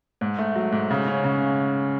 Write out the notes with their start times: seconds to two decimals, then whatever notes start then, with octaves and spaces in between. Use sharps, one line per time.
0.21 G#2
0.39 A3
0.55 F#3
0.72 G#2
0.91 C#3
1.08 C#4
1.24 C#3